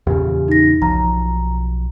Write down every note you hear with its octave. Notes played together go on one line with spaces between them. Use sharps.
E2 A#2 C#3 G4
D#4 A#6
B1 F3 A#5